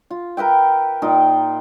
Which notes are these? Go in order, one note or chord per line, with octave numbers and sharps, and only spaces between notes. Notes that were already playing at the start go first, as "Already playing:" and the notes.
F4
A#4 B4 E5 G5
A#2 D#4 F4 G5